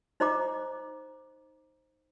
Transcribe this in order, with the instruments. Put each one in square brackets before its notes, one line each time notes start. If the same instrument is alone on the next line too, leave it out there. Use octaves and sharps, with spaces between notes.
[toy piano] D#4 C5 D#5 A#5 D6